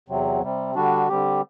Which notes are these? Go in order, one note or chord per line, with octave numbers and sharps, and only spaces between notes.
E2 C3 F#3 C4
C3 G3 C4
D3 G3 D4 F#4
D3 G3 C4 G4